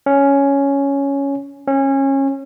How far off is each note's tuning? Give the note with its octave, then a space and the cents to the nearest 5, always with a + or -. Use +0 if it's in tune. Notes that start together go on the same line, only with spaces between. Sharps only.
C#4 +5
C#4 -25